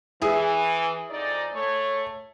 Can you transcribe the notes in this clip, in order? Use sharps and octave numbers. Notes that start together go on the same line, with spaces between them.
E3 E4 G#4
F2 D#4 D5
A3 C#5